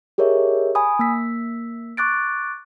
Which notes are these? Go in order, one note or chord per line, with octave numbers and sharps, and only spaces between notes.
G4 G#4 A#4 C#5 D#5 E5
G#5 B5 D#6
A#3 E6 B6
C#6 D6 F#6 A6 D7